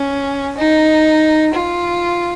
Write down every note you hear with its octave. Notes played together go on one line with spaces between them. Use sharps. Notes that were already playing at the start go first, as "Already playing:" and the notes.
Already playing: C#4
D#4
F4